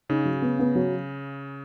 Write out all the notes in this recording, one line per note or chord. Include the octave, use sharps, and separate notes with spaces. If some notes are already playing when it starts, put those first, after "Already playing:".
C#3 D#4
F#3
B3
B3
F#3